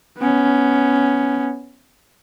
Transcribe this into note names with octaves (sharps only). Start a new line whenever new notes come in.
B3 C#4